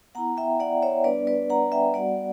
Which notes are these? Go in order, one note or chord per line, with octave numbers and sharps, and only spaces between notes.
B3 E4 F#5 A#5
E5 G5
D5 F#5
C#5 E5
G3 B3 D4 B4 D5
B4 D5
F#5 A#5
E5 G5
G3 B3 F#4 D5 F#5